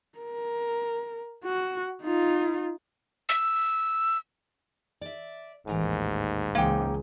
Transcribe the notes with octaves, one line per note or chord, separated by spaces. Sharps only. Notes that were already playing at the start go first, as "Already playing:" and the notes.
A#4
F#4
D#4 F4
E6
D5 E5
A1 D#2 G#2 E3 A#4 G#5
C#2 E3 A#3 G5 G#5